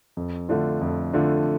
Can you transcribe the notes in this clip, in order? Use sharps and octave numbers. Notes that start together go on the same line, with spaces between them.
F2
D3 A3 D4 F4
F2
D3 A3 D4 F4